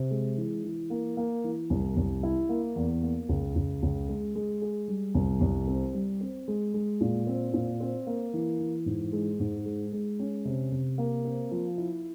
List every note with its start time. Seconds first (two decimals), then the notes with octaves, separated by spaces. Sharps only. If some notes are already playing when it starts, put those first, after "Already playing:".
Already playing: C3
0.11 G#3
0.37 E3
0.64 E3
0.90 A#3
1.17 A#3
1.44 E3
1.70 C2
1.96 C2
2.23 E4
2.49 A#3
2.76 E2
3.02 A#3
3.29 C#2
3.56 C#2
3.83 C#2
4.09 G#3
4.35 G#3
4.62 G#4
4.88 G3
5.15 C2
5.41 C2
5.68 C4
5.94 G3
6.21 C4
6.48 G#3
6.74 G#3
7.01 A#2
7.27 C4
7.53 A#2
7.80 C4
8.06 A#3
8.33 E3
8.59 E3
8.86 G#2
9.13 G#3
9.39 G#2
9.65 G#3
9.92 G#3
10.19 C#4
10.45 C3
10.72 C3
10.98 A#3
11.25 C4
11.51 F3
11.78 E4